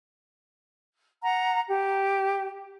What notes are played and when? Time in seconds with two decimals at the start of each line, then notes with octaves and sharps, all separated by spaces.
1.22 F#5 A#5
1.68 G4